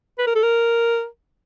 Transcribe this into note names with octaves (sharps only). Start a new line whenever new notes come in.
B4
A#4
A4
A#4